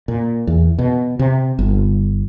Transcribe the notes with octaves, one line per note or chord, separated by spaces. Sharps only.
A#2
E2
B2
C3
G1